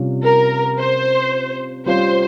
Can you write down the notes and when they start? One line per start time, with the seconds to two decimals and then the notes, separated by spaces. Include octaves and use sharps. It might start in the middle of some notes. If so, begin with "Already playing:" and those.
Already playing: C3 G3 C#4 F4
0.25 A#4
0.78 C5
1.86 G3 C#4 F4 C5